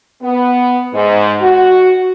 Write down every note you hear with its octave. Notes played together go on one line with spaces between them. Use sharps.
B3
G#2
F#4